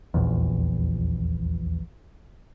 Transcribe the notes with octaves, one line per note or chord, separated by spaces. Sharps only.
D#1 A#1 E2